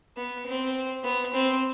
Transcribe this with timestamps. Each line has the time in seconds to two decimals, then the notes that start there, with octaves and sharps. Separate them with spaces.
0.17 B3
0.46 C4
1.04 B3
1.33 C4